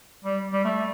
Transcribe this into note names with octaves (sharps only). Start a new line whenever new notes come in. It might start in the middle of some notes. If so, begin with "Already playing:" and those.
G3
G3
A3